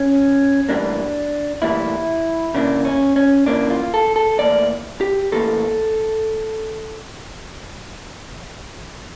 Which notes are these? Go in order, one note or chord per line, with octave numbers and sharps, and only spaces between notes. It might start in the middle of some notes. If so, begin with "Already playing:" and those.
Already playing: C#4
A2 E3 G3 A#3 D4
A2 E3 G3 A#3 E4
C#3 E3 A#3 D4
C#4
C#4
C#3 E3 A#3 D4
F4
A4
A4
A2 E3 A#3 D5
G4
A2 E3 A#3 A4